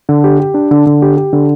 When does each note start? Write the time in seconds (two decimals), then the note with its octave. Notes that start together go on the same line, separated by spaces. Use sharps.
0.09 D3
0.24 G4
0.40 G4
0.54 D4
0.71 D3
0.86 D3
1.02 G4
1.17 G4
1.33 D3